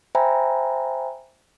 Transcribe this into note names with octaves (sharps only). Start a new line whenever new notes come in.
C5 E5 G5 G#5 A#5 B5